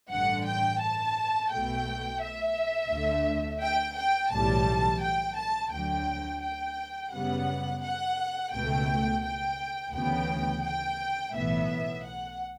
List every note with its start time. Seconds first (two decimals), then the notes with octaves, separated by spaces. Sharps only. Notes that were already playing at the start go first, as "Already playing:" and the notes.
0.10 A1 G2 D3 F#5
0.46 G5
0.81 A5
1.51 B1 B2 A3 G5
2.22 E5
2.91 D2 D3 A3
3.61 G5
3.97 G5
4.31 B1 A2 E3 G3 A5
5.02 G5
5.37 A5
5.72 D2 D3 F#3 G5
6.42 G5
7.12 F#2 C#3 G3 B3 F#5
7.83 F#5
8.53 C#2 B2 A3 G5
9.23 G5
9.93 D2 C#3 E3 B3 G5
10.63 G5
11.34 B1 A2 E3 B3 E5
12.03 F#5